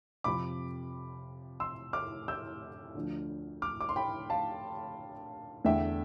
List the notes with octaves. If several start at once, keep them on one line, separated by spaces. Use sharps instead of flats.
F2 C3 F3 B5 D6
C6 E6
D6 F6
E6 G6
D2 D3 F3
D6 F6
D6
C6
G5 B5
F5 A5
E2 D3 A3 E5 G5